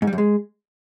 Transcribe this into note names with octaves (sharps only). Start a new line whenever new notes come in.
G#2
G3
F#2
G#3